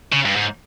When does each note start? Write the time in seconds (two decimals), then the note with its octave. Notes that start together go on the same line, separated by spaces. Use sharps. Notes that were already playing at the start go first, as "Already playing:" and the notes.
0.13 C#3
0.26 G2
0.36 G#2